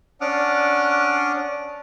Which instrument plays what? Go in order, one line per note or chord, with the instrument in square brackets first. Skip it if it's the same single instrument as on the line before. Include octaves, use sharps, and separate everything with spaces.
[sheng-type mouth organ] C#4 D4 F#5 D6 D#6 F6